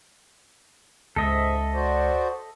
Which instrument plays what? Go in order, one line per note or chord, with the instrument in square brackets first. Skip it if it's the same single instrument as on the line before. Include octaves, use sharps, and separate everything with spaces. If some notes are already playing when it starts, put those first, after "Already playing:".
[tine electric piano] C#2 [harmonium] G#2 [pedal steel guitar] A4 D#5 E5
[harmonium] F#4 C5 D5